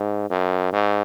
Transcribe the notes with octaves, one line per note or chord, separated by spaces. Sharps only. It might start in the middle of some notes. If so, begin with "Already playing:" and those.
Already playing: G#2
F#2
G#2